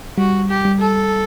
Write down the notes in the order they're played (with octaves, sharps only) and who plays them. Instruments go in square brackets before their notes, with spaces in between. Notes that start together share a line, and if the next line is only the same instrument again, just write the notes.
[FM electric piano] G3 [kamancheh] F#4
[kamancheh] G4
[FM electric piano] G3
[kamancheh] A4